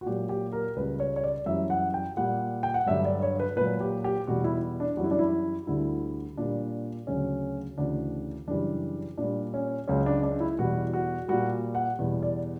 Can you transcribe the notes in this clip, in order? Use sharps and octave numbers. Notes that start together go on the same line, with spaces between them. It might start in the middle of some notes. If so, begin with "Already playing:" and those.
F#4
A#2 F#3 G4
G4
A#4
C#2 C#3 G3 B4
C#5
C#5
D5
F#2 E3 G3 E5
F#5
G5
A#2 G3 F#5
G5
F#5
G2 D3 F#3 E5
D5
C#5
B4
A#2 F#3 B4
G4
G4
E2 B2 G3 F#4
E4
D4
F#2 E3 G3 F#4
E4
D4
E4
D2 D3 G3 E4
A#2 G3 D4
D2 C#3 F#3 C#4
D2 C#3 E3 D4
F#2 C#3 E3 G3 D4
A#2 G3 D4
C#4
C#2 C#3 F#3 C#4
D4
D4
E4
E2 B2 G3 F#4
F#4
A#2 G3 F#4
F#5
E2 B2 G3
D5